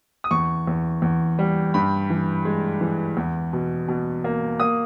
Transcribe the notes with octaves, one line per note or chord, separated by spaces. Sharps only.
D#6
E2 C#6
E2
E2
G3
G2 B5
E3
G#3
E3
E2
B2
B2
A#3
A#3 D#6